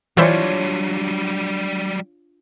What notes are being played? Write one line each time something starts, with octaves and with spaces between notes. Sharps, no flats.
E3 F#3 G3 D4 E4 F4 C5 C#5